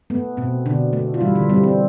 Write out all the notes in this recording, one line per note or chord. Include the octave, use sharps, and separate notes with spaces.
A3 B3
B2 C4
B2 D3 D4
A3
F4
E3 G3 E4
D3 D4
G3 C4
C4